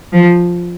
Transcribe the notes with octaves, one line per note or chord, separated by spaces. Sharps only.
F3